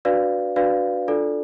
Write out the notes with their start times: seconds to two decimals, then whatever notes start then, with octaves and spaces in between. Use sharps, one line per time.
0.05 D4 F#4 B4 D5 F5
0.56 D4 F#4 B4 D5 F5
1.08 D4 F4 A4 D5